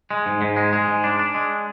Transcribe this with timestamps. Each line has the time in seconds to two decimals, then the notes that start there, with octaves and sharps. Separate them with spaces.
0.11 G#3
0.26 G#2
0.42 G#2
0.56 G#3
0.73 G#3
0.88 G#2
1.04 D4
1.19 D4
1.35 G#3